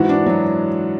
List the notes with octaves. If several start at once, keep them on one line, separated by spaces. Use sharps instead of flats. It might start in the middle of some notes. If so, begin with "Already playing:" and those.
Already playing: G#2 E3 F#4
D4
F#3